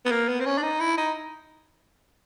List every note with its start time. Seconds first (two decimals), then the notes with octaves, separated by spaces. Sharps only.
0.06 B3
0.11 A#3
0.28 B3
0.40 C4
0.46 C#4
0.58 D4
0.63 D#4
0.80 E4
0.97 D#4